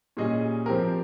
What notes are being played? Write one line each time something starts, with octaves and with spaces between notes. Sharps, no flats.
A#2 G3 C#4 G#4 D#5
F3 C4 G4 A#4